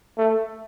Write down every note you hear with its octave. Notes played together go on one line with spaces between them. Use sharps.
A3